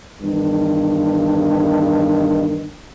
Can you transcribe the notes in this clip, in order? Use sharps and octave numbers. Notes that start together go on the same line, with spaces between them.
E2 G2 D#3